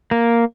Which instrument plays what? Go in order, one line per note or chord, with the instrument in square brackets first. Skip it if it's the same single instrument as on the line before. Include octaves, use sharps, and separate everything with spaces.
[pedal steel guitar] A#3